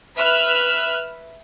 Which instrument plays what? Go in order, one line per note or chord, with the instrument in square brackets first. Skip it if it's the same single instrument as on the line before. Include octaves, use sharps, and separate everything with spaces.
[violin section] B4 E5 F6 F#6